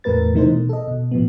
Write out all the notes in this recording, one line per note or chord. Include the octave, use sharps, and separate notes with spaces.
E2 A2 A3 A#4 B4 A6
C3 E3 A3 D#4 A#4 C5
B2
A4 D#5
B2
A2 F3 B3